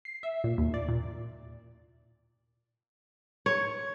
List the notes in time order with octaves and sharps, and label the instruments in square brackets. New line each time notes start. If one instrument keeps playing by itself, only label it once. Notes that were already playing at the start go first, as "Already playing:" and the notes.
[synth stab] C7
E5
A#2
D#2
D5
A#2
[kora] C#5